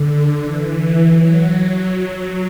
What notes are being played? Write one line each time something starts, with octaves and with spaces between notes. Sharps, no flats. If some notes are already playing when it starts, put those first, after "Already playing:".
Already playing: D3
E3
F#3